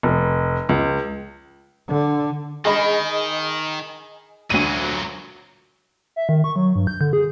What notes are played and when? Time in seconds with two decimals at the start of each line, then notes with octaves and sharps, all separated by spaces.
0.03 F1
0.69 C#2
1.88 D3
2.65 D#3 G#4 D#5 B5
4.50 D2 A#2 F#3 D#7
6.16 E5
6.29 D#3
6.44 C#6
6.56 F#3
6.76 G2
6.87 G6
7.01 D3
7.13 G#4